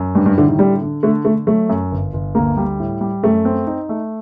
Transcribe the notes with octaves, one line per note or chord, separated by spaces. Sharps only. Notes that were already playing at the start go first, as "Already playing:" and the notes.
Already playing: F#2
G2 G3
G2
A2 D3
D#3
D3 G3
D3
D3 A3
D3 A3
F#3 A3
F#2
G1
G1
D2 A#3
G3
A2
G3
F#2 A3
C4
D#4
A3